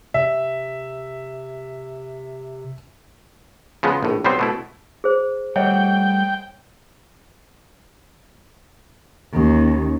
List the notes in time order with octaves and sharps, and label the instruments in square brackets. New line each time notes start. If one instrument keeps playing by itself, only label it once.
[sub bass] C3 [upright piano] E5
[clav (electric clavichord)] C#3 F3 G#3 B3
A#1 A2
B1 G3 B3 C4 C5
B2 A3 E4
[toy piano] G#4 C5
[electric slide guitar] G3 A3 F#5 [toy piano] C#5 D#5 E5 [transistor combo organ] G5
[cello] D#2 [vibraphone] A#3 C#4 D#4